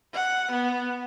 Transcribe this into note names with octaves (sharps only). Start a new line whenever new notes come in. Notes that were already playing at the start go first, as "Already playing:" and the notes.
F#5
B3